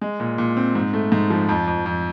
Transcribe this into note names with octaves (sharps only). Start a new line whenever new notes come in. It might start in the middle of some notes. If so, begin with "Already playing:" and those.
G#3
A#2
A#2
C4
G#2
A3
G#2
F3
F2
F2
F2